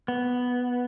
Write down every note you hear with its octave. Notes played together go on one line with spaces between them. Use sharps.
B3